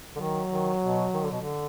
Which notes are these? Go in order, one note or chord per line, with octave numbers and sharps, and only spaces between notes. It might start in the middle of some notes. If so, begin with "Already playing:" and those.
D3
D#3 F#3
D#3
B2
D#3
D3
B2
D3